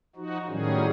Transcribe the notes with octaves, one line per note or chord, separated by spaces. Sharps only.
F3 D#4 F#4
A2 D#3 F#3 G3 C#4 G#4